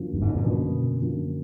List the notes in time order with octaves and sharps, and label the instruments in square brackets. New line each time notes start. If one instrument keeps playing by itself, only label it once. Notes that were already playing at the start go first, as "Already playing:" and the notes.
Already playing: [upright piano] F#2 D3 F3 A#3
[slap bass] G2
G#2
A2
A#2
[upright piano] F#2 D3 F3 A#3 [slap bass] B2
[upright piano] F#2 D3 F3 A#3